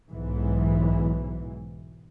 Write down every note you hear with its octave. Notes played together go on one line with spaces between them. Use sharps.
B1 G#2 E3